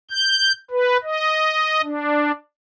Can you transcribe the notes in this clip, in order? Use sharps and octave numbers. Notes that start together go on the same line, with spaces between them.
G6
B4
D#5
D4